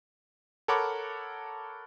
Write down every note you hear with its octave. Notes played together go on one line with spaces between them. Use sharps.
A4 A#4 C#5 F#5 B5 D6